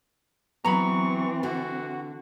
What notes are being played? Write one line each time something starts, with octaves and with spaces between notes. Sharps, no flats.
E3 F#3 B3 C4 A#5 B5 C#6
D3 F#4